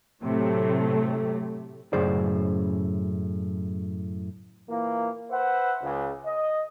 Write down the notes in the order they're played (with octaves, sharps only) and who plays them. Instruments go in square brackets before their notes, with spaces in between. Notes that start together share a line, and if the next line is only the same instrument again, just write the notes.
[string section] A2 C3 F#3 A3
[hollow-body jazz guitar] F#2 A2 C#3 G#4 C5 D5
[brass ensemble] A#2 E3 A#3
B4 C5 E5 F#5
C#2
D#5